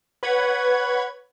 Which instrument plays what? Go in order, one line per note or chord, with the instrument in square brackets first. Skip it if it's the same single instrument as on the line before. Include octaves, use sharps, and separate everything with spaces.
[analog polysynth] B4 C#5 F#5 B5 G#6